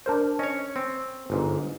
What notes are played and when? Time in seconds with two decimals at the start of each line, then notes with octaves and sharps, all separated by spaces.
0.06 D4 A#4 C5
0.39 C#4 C#5 D#5
0.76 C4
1.30 G1 G#2